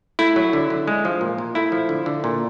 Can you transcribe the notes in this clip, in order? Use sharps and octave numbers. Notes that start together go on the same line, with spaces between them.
A3 E4
F#3
D3
D3
G#3
F3
A#2
A#2
A3 E4
F3
D3
D3
A#2